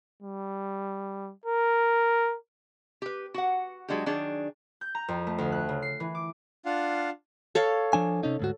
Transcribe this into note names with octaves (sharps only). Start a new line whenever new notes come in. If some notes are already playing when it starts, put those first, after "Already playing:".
G3
A#4
G4 B4
F#4 F#5
F#3 G#3 D4 F#4 G4
D#3 F#3 D4 G#4 A#5
G6
A#5
F2
A3
D2
F#6
C#3
C7
E3
D6
D4 F4 F5 F#5
A4 C#5 F5
F3 D4 G#5
C3 C#4 D#4
D2 G#2 F#4